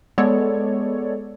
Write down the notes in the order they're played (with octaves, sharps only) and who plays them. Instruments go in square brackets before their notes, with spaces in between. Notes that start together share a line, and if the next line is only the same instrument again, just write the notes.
[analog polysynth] G#3 B3 A4 C#5 D5